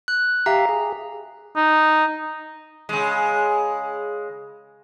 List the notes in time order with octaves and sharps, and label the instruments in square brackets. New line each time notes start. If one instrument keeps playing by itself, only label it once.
[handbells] F#6
[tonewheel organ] G4 E5 F5 [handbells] A#5
[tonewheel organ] G#4
[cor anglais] D#4
[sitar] C#3 G#3